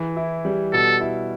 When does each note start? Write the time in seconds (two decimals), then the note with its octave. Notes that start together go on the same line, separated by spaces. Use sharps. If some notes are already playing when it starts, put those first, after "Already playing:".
Already playing: E3
0.16 E4
0.45 G3
0.73 B2 A4
1.01 E4